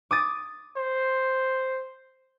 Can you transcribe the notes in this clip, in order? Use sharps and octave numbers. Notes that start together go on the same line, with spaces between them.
D6 D#6 A6
C5